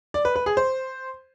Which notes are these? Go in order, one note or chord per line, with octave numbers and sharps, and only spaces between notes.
D5
B4
B4
G#4
C5